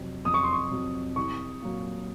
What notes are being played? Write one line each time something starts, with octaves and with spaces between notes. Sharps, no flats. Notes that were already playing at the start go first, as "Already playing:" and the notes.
Already playing: F2 C3 F#3
F2 D#6
C#6
C6
C#6
C3 F#3
C2 C#6
A#2 F#3